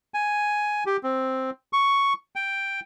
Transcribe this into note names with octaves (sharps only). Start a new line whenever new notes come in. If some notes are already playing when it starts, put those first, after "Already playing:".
G#5
G4
C4
C#6
G5